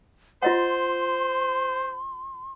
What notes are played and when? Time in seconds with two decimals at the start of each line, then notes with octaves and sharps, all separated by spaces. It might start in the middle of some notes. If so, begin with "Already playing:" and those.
0.43 F4 C5 D#5 F#5 C6